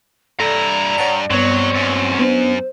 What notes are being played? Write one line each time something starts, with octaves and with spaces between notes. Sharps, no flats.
G2 E4 A4 D5 A#5
G2 C#5 F#5 A5
G2 F#3 B3 C4 C#5
F#2
B3 D4 C5